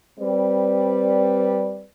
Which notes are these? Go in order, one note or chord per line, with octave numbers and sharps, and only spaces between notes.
G3 C4 B4 D5